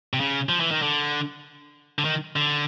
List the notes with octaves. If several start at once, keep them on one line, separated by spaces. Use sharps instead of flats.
C3
C#3
F3
E3
D#3
D3
D3
D#3
D3